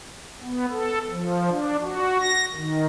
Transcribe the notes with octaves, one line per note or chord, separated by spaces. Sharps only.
B3
A4
F3
D4
F#4
A#6
D#3